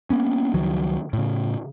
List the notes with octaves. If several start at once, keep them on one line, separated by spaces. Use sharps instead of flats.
A#3 B3 C#4
C#2 D#3 F3 F#3
A2 C#3